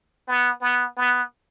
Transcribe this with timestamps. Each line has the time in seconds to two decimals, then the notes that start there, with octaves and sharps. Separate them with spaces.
0.28 B3
0.61 B3
0.97 B3